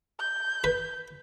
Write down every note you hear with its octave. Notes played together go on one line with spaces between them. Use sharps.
G6
B4